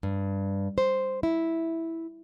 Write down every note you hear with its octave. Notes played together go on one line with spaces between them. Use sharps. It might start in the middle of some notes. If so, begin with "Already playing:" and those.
G2
C5
E4